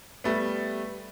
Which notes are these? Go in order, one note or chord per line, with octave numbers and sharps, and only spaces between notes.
G3 A3 B3